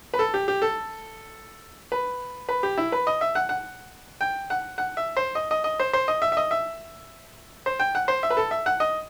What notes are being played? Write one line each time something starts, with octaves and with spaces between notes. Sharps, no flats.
B4
A4
G4
G4
A4
B4
B4
G4
E4
B4
D#5
E5
F#5
F#5
G5
F#5
F#5
E5
C5
D#5
D#5
D#5
C5
C5
D#5
E5
E5
D#5
E5
C5
G5
F#5
C5
E5
B4
A4
E5
F#5
D#5